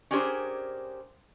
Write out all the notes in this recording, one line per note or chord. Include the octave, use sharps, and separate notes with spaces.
C#4 D4 G4 G#4 A#4 C5